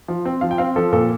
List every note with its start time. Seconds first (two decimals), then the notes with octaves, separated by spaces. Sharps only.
0.08 F3
0.25 C4
0.41 F3 F5
0.51 G5
0.58 C4 F5
0.76 F3 A4
0.92 A#2 A4